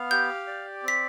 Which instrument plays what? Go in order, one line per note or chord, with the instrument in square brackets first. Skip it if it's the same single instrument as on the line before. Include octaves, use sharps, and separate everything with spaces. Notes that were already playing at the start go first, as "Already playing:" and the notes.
Already playing: [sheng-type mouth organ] B3 F5
[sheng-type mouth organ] G4 [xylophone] G6
[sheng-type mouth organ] D5
[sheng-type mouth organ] C4 [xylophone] B6